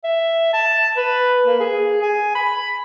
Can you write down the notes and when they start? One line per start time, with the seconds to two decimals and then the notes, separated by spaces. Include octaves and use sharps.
0.04 E5
0.53 A5
0.96 B4
1.46 A#3
1.60 G#4
2.02 G#5
2.35 B5